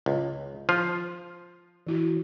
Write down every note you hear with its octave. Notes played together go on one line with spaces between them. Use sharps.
C#2
F3 F4
E3 E4 F#4